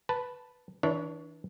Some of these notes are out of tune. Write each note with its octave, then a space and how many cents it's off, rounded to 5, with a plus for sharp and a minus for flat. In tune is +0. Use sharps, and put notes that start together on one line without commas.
B4 +0 A5 +0
E3 -35 D4 -5 C#5 +20